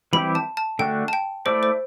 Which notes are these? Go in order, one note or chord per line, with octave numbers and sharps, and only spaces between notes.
E3 G3 C4 E4 G4 B5
A5
A5
D3 A3 D4 F#4 G5
A5
G5
A3 E4 A4 C5 D5
C5